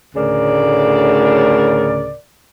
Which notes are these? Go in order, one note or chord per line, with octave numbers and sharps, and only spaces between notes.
D2 A2 C#3 A#4 D5